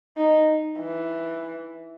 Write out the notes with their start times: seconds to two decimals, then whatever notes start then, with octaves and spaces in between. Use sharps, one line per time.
0.17 D#4
0.79 E3